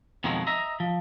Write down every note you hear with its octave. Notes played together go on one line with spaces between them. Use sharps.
F2 B2 D#3 F3 F#3 G#3
D#5 E5 A#5
F3